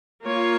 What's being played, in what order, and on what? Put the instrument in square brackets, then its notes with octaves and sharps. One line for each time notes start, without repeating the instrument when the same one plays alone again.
[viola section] A#3 F4 C#5